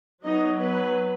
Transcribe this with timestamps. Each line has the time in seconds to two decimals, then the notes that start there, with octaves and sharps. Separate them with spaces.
0.23 F#3 B3 D#4 D#5
0.57 B3 B4